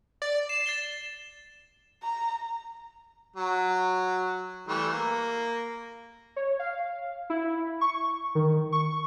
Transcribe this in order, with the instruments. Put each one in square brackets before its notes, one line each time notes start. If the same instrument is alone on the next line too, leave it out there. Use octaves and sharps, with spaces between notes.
[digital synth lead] D5
[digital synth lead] C7 [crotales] E7
[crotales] A6 E7 G7
[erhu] A#5
[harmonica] F#3
E3 G3 A3
A#3
[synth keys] C#5
F5
E4
C#6
D#3
C#6